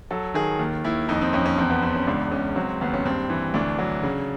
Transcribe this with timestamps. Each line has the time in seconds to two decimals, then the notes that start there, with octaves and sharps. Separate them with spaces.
0.11 F#3 A4
0.34 D#3 G#4
0.59 D#2
0.84 D#2 E4
1.08 F2 D#4
1.21 C4
1.33 F2 C#4
1.46 C#4
1.58 E2 C4
1.70 B3
1.82 E2 C4
1.95 C#4
2.07 C#2 D4
2.31 C#2 C#4
2.56 F#3 C4
2.81 D#2 B3
2.94 C#4
3.05 G2 C4
3.30 E3
3.54 D2 D4
3.79 F#3
4.03 C#3